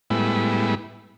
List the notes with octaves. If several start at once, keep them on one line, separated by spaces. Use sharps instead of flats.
A2 G3 G#3 B3 E4